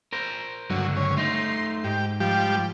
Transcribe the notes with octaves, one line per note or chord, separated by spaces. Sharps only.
A#4 C5
C#2 G2 D3 F#3
C#4
A3 D#4 C6
G#2 G4
F3 G3 G4